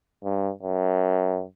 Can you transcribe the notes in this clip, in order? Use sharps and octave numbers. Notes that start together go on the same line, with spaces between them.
G2
F#2